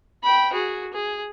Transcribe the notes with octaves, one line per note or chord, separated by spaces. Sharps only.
G5 B5
F#4 G#4
G#4